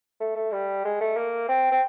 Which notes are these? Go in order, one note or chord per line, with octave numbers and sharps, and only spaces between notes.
A3
A3
G3
G#3
A3
A#3
C4
C4